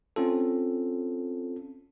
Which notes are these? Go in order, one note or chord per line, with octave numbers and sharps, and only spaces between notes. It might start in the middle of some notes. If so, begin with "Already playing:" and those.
C4 C#4 F4 A4